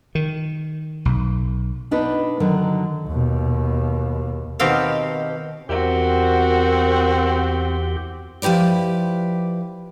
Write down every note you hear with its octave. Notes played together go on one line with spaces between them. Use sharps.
D#3
B1
B3 D4 D#4 B4
D3 D#3 F#3
D#2 B2
B2 D#3 C4 G4 F5
E2 C4 F#4 G4 A#4
F3 E4 G4 B4 D5